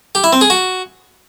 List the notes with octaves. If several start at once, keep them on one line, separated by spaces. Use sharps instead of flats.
G4
E4
C4
G#4
F#4